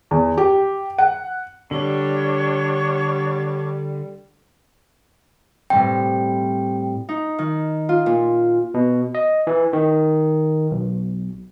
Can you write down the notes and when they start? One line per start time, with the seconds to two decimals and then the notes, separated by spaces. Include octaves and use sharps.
0.11 E2
0.38 G4
0.98 F#5
1.71 D3 G3 D4 C#5 C#6
5.70 A2 G3 C4 G5
7.09 D#4
7.38 D#3
7.89 F4
8.06 A#2
8.74 B2
9.15 D#5
9.47 E3
9.73 D#3
10.71 B1